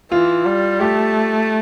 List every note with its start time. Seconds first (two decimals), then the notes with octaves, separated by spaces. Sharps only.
0.12 E3 F4
0.46 G3
0.80 A3 G4